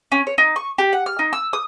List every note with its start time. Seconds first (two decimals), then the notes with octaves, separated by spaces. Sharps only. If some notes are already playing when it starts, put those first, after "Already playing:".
0.12 C#4
0.27 C#5
0.38 D#4
0.56 C#6
0.78 G4
0.93 F#5
1.06 F6
1.19 D#4
1.33 E6
1.53 D#6